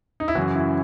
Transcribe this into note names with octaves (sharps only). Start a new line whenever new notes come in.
D#4
E4
F#2 C#3 E3 F#4
E4